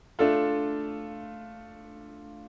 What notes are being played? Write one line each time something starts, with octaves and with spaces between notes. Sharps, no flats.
A3 D4 F4 A4